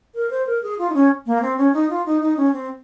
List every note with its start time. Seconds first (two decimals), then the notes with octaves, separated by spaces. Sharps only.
0.15 A#4
0.31 C5
0.47 A#4
0.63 G#4
0.78 F4
0.90 D#4
0.94 C#4
1.26 A#3
1.42 C4
1.58 C#4
1.73 D#4
1.90 F4
2.06 D#4
2.22 D#4
2.37 C#4
2.53 C4